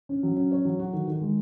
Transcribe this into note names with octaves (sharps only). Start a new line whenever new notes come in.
C#4
F#3
C#4
C#5
F#3
F#4
D#3
D#3
G#3